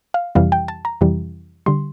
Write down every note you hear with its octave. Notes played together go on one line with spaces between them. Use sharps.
F5
F2 C3 E3 G3 F5
G5
A5
A#5
F2 C3 E3 G3
D3 G3 C6